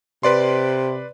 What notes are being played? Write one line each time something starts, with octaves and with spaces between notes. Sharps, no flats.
C3 B4 D5 C6